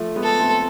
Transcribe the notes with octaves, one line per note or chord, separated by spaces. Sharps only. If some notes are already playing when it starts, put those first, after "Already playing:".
Already playing: F3 A3
G#3 B3
A4
A3 C4